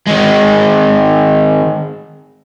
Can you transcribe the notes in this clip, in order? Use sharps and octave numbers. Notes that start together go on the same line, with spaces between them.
D#3 G#3